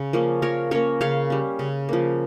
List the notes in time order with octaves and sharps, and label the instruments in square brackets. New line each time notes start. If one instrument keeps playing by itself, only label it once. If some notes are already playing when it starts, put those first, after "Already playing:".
Already playing: [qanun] C#3
F3 A#3 C#4
F3 A#4 C#5
A#3 C#4 A#4 C#5
C#3 C#5 F5
G3 C#4
C#3
F3 A#3